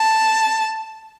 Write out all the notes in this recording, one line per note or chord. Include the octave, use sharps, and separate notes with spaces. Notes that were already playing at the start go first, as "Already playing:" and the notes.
Already playing: A5